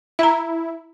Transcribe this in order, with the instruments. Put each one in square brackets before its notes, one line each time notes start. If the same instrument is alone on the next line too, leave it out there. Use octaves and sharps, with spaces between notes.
[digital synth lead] E4 [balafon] E5 A#5